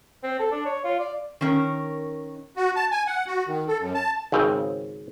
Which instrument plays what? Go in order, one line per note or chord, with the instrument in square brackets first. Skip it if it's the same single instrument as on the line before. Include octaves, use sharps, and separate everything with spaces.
[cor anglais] C4
A4
D4
C#5
F4
D5
[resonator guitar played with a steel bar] D#3 C#4 A#4
[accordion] F#4
A5
G#5
F#5
F#4
D#3
A4
F#2
A5
[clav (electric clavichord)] G#1 C#3 C4